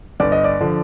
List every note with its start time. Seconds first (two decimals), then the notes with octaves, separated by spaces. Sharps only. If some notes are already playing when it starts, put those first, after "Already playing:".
0.20 G1 D5
0.32 D#5
0.44 D5
0.61 D3 F3